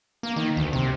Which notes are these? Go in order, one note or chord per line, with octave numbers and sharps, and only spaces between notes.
A#3
D#3
D2
C3